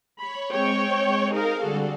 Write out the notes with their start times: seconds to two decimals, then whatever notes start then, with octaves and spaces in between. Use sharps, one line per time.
0.19 C#5 B5
0.51 G#3 C4 C#5 G5
1.32 D#4 G#4 A#4 F5
1.62 D3 G3 F#4 G#4 A4